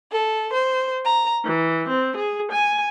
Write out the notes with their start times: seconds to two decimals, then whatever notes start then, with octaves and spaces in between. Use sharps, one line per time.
0.12 A4
0.53 C5
1.05 A#5
1.44 E3
1.87 C4
2.16 G#4
2.50 G#5